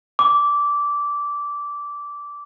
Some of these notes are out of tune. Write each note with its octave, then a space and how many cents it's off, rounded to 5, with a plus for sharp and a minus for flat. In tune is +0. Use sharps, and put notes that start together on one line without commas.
D6 -15